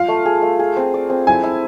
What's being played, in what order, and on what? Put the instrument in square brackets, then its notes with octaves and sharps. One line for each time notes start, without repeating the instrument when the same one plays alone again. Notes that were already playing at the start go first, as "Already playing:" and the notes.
Already playing: [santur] F4 [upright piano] F5
[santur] A3
G#4
A3
G#4
C4
D5
C4
[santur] E4 [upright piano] G#5
[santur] E4